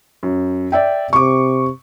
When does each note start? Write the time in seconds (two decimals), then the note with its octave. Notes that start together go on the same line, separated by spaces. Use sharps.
0.23 F#2
0.72 D5 E5 G5
1.13 C3 C#6 D6